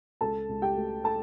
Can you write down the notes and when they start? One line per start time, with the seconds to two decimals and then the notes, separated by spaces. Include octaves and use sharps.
0.21 C#2 A4 A5
0.49 C#2
0.62 G4 G5
0.77 A3
1.04 A4 A5